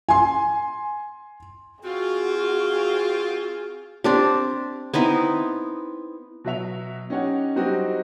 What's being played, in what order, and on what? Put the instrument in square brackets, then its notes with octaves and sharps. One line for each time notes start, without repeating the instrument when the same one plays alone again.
[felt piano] G#5 C6
[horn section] C4 F4 [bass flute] F#4 [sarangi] G#4
[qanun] C4 D4 G4
B3 C4 D#4 E4
[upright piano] B2 F#3 E5 F7
C#4 D#4 G4 C#5 F#5
F#3 G3 C4 D#4 F#4 G4